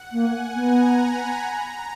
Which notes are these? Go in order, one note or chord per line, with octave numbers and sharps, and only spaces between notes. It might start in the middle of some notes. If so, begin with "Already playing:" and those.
Already playing: F#5
A#3 G#5
B3 A#5
B5
A#5